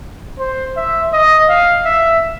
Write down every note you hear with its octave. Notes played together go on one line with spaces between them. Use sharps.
C5
E5
D#5
F5
E5